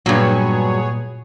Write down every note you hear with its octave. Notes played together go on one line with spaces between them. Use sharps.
G2 A#2 F#3 B3 G#4 C#5